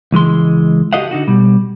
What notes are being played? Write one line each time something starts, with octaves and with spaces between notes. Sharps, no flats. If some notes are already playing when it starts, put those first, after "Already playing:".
C#2 E3 G#3 C6
F#4 G4 A4 D#5 F5 F#5
D3 D#4 F#4
B2 G3